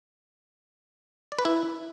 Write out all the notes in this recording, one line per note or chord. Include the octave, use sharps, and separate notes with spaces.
D5
B4
E4